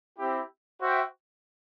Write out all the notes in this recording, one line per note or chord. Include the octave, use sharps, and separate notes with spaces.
C4 E4 G4
F#4 C5 E5 G5